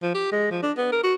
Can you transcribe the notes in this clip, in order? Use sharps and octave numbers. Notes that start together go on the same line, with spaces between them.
F3
G4
G#3
F3
D4
B3
A#4
F#4